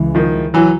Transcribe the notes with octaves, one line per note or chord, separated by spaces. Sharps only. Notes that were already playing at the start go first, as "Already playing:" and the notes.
Already playing: C#2 C#3 E3 G#3
D#3 F3
E3 F#3